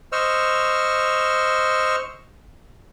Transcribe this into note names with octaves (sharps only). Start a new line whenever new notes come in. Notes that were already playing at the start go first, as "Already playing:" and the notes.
C5 D#5 C#6 E6 F6